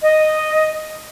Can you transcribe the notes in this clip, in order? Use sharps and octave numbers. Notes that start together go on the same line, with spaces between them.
D#5